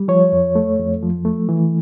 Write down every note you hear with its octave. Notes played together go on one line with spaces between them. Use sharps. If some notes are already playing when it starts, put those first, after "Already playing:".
Already playing: G3
F3 C#5
F2
A3
F2
F3
A3
E3